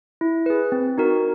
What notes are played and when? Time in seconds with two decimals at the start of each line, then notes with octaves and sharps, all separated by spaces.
0.21 E4
0.46 G#4 B4
0.72 C4
0.98 D#4 F#4 A#4